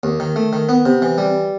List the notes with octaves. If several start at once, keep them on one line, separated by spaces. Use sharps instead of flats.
D#2
D#3
A3
D#3
B3
C3
E3
G3